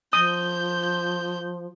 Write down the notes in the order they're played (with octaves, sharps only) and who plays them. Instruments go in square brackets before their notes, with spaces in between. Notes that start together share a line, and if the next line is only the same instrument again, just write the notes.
[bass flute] F3 [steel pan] D#6 [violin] G6